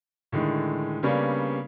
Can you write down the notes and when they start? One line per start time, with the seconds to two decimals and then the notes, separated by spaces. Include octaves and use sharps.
0.32 A2 D3 D#3 G#3
1.03 C#3 G3 A#3 B3 C#4 D4